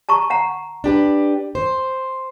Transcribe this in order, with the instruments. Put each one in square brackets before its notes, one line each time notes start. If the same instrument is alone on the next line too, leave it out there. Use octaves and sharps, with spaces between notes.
[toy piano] A5 A#5 C#6
F#5 A#5
[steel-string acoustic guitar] D4 G4 B4
C5